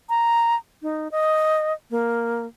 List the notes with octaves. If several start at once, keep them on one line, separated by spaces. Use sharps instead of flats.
A#5
D#4
D#5
A#3